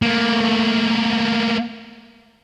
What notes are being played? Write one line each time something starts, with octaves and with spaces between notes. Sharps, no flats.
A3 A#3